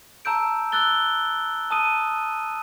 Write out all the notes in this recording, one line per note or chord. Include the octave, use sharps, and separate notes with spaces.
A5 A#5 E6 G6 D7
E6 F#6 A6 G7
A5 D#6 D#7